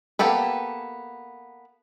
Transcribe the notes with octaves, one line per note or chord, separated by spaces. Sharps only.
A#3 B3 G4 A4 B4